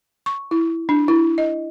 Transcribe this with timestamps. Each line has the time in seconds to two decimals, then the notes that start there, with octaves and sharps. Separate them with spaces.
0.26 C#6
0.51 E4
0.89 D4
1.08 E4
1.38 D#5